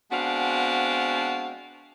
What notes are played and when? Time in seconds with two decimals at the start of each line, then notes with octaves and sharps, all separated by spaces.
0.12 G#3 B3 C4 D4 F#4 F5